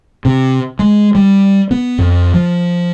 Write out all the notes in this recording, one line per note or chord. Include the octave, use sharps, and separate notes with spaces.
C3
G#3
G3
B3
F2
F3